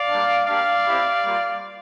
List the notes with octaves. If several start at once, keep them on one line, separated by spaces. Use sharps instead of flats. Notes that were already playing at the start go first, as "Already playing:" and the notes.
Already playing: D5 F5
G3 A#3 D4
G3 A#3 D4 G4 D5 F5
C4 E4 G4
G3 A#3 F4